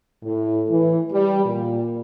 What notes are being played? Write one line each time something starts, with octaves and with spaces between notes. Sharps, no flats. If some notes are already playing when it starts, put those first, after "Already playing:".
A2
E3
G3
A#2